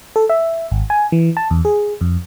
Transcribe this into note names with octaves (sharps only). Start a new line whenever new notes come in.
A4
E5
G#1
G#5
E3
A5
E2
G#4
F2